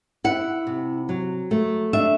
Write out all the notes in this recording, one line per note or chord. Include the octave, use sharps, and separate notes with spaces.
E4 F#5
C3
F#3
A3
D4 E5